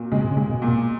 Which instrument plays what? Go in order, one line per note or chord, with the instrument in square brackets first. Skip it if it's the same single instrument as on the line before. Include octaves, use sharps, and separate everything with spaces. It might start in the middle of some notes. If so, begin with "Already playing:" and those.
Already playing: [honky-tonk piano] A#2 F#4
[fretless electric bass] C#3 [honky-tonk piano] G#3
[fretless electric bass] B2
C#3
[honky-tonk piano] G#3
[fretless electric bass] B2
[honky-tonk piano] A#2
[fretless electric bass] B2